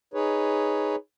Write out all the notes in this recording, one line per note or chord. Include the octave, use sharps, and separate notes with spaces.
D#4 G#4 B4 C#5